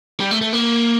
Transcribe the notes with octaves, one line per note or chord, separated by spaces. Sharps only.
G3
A3
A3
A#3